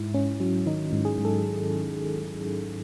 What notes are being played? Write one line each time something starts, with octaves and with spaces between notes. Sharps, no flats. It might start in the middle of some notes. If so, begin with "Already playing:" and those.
Already playing: G#2 E4
G#2 C#4
F#3 C#4
D#3 D#4
G#2
G#4
G#2
A4